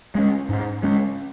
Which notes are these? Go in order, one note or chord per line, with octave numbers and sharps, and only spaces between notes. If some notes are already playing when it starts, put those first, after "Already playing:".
G#3 C#4
G#2
G#3 C#4